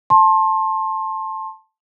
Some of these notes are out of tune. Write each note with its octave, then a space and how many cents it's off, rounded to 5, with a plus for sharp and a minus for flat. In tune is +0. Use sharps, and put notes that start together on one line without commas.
A5 +0 C6 +30